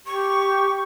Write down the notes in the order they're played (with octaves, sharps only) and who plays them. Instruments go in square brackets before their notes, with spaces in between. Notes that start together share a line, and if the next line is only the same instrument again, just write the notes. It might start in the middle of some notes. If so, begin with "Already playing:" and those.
[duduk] G4 [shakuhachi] C#6